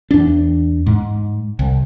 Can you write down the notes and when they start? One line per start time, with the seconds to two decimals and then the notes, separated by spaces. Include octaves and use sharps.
0.11 E2 D4
0.87 G#2
1.59 C2